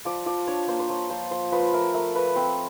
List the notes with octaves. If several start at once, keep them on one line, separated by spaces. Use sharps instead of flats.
F3 D5
F3 D5
D4 C#5
A#3 C5
C5
F3 C#5
F3 C5
F3 C5
F3 B4
A3 A#4
A3 A#4
A3 B4
C4 C5